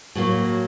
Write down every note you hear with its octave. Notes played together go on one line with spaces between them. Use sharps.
A2 F#3 A#3